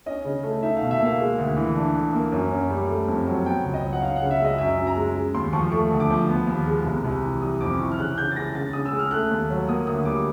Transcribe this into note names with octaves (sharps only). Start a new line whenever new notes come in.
C#4 D#5
C#3
A3
D#4 E5
B2 F5
E5
A#3 F5
G#3
D2
E3
D4
D3
A#3
F#2
F#2
G3
A3
F2
F#3
B3 G5
C#2
D#5
F#3
F#5
C#4 F5
F#5
C#3
E5
G#3 D#5
F#2 E5
F#2
A#5
G#3
G#3
D#2 C6
F3 C#6
A3 C#6
D2
D6
F3
B3
D#2
G#3
C2
C2
E3
G3 D#6
F2 D6
E3 C#6
F6
C#3 F#6
C#3 G6
A6
G#3 A#6
C#3 A6
C#3 D#6
E6
G#3
F6
A3 F#6
D#2
F#3
A#3 D#6
D2 D#6
G3 D6